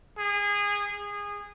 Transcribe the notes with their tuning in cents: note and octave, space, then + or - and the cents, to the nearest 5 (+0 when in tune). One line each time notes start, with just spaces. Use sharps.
G#4 -25
G#4 -20